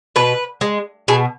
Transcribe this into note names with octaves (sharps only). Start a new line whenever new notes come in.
B2 B4
G#3
B2 G#4